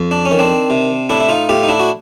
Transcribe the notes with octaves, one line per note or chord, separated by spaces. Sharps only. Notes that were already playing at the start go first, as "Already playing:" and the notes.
Already playing: F2
D4
C#4
D#3
C4 D4
C3
A2 D4 E4
E4
D#4 F4
A2 F4 G4
D#4
D4 E4
F#4